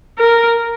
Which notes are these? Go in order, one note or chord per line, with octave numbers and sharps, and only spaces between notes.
A#4